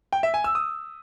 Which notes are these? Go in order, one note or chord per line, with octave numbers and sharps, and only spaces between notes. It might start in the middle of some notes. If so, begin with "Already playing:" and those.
G5
E5
G#5
E6
D#6